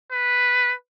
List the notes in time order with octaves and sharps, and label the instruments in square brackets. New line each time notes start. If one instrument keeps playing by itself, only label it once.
[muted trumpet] B4